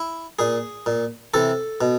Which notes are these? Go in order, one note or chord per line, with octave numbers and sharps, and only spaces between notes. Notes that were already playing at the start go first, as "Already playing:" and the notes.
Already playing: E4
A#2 G#4
A#2
C3 E3 A4
B2